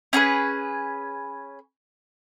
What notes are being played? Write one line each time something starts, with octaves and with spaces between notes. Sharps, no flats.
C#4 G#4 A4 B4